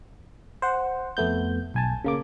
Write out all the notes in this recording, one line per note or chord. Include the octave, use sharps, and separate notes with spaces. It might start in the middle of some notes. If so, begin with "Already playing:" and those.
C5 F#5
F2 A3 B3 G6
B1 G#5 A5
C#3 A#3 D6